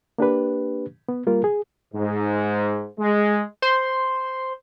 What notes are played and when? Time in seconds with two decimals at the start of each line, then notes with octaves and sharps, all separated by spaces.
0.18 A#3 D4 G4 B4
1.09 B3
1.27 G3 A#3 F4 A#4
1.44 G#4
1.94 G#2
2.99 G#3
3.62 C5 C6